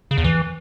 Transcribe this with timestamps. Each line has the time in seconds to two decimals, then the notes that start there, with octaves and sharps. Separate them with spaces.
0.11 C#3
0.18 E2
0.24 E3